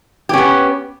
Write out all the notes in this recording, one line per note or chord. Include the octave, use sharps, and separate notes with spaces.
B3 C#4 G4